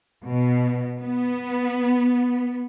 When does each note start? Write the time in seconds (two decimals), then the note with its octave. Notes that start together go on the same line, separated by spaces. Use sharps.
0.24 B2
1.00 B3